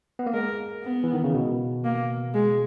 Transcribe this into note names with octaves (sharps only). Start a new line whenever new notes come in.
B3
A#3
G#3 A#4
B3
E3
D#3
C#3
B2
A#3
G#3